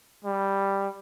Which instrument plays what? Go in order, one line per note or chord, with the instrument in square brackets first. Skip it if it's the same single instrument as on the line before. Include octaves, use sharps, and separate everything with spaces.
[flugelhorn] G3